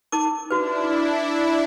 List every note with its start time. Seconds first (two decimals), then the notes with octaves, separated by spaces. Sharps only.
0.12 D#4 A#4 D6
0.51 D4 E4 F#4 B4